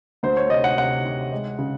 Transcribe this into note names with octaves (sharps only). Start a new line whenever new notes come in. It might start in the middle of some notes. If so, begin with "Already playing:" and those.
D2 C5
C#5
C3 D#5
F#5
C3 F#5
C3
G#3
C#3